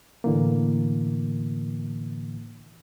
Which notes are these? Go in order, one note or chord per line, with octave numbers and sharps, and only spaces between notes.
A2 D3 E3 A#3